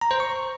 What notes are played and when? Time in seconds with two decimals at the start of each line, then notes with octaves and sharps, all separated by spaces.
0.01 A#5
0.11 C5
0.20 C#6